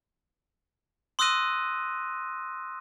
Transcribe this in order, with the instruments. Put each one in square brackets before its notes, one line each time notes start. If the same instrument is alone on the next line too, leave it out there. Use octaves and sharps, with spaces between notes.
[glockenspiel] C6 D#6 E6 F#6 A#6 D#7